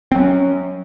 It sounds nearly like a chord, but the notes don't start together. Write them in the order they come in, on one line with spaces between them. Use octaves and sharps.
C4 F#3 C#4